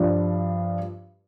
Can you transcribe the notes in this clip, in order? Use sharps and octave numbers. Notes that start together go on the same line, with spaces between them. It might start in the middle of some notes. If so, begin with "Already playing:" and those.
Already playing: G2 F3 D4